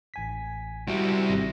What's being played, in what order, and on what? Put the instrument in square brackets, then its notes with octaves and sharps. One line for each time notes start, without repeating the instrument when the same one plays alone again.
[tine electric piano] A1 G#5 B6
[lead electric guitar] G3 E4 [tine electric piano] F#4
[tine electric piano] G#1 C3 A#6